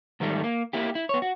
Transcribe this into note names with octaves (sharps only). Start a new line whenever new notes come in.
G#2 D#3 G3 A3
A#3
A#3 E4 G4
E4
B3 C#5
F#4